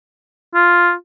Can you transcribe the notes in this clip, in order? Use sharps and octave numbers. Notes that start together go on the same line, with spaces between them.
F4